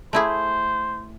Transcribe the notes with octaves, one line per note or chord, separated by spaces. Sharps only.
A3 E4 G#4 C5